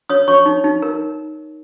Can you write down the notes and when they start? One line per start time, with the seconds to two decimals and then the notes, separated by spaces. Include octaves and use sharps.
0.09 C#5 D#6
0.28 C#5 C#6
0.46 D#4
0.64 D#4
0.82 A#4